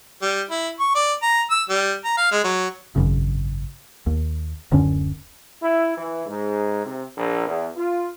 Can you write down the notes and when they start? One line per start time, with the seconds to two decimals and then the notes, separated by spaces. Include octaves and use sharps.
0.22 G3
0.50 E4
0.80 C#6
0.95 D5
1.22 A#5
1.51 E6
1.70 G3
2.05 A#5
2.17 F5
2.32 G#3
2.44 F#3
2.96 G#1 F#2 C#3
4.06 D#2
4.71 D1 F#2 D3 C#4
5.62 E4
5.97 E3
6.26 G#2
6.85 C3
7.16 A#1
7.47 E2
7.76 F4